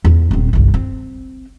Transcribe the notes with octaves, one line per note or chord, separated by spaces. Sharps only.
E2
D#1 C4
G1 C2
C4